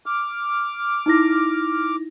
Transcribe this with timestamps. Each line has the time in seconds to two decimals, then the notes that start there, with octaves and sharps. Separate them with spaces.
0.06 D6 F6
1.06 D#4 E4 A#6